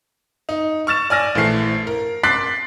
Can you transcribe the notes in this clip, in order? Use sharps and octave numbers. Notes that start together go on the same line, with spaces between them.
D#4
C#6 F6 A6 E7
D5 G#5 F6 A#6
A#1 E3 A3 C7
A#4
C6 D6 F#6 A6 B6 C7